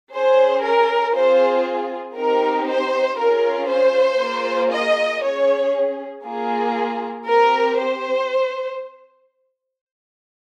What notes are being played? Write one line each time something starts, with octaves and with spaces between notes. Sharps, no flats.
C#4 G#4 C5
A#4
C4 F4 G#4 C5
C4 D#4 G4 A#4
C5
C#4 F4 G#4 A#4
C5
A#3 F4 G#4
D#5
C#4 G#4 C#5
A#3 F4 G#4
C4 G4 A#4
C5